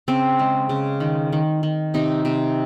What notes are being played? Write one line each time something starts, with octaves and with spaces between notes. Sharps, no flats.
C#3 C4
G#3
C#3
D#3
D#3
D#3
C3 D#4
C3